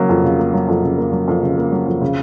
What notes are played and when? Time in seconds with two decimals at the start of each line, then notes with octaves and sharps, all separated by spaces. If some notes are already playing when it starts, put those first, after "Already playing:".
Already playing: C#3 F#3 A#3
0.09 F2
0.23 C#3
0.39 A#3
0.54 F#3
0.68 F2
0.82 C#3
0.98 A#3
1.12 F#3
1.28 F2
1.43 C#3
1.57 A#3
1.72 F#3
1.87 F2
2.01 C#3